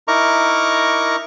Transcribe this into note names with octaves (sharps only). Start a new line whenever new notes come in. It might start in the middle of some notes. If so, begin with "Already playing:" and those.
D#4 E4 A#4 A#5 C#6 D6